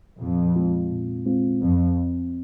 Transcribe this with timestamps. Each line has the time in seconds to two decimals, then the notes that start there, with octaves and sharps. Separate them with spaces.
0.21 F2 A#2
0.56 G#3 C4 F4
0.91 A#2
1.25 G#3 C4 F4
1.61 F2 C4